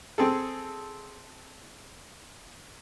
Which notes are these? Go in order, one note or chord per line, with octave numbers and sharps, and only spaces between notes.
C4 G#4 A4